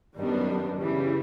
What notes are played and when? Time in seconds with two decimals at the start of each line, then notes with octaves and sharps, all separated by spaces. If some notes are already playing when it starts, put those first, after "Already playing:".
0.17 F#2 D#3 G3 B3 D4
0.79 C#3 E3 G3